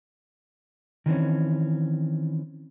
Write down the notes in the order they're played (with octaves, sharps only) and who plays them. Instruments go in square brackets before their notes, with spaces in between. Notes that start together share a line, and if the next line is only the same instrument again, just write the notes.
[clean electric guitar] D#3 E3 C4 C#4